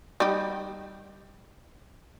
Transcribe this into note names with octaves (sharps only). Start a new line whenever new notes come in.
G3 D#4 G4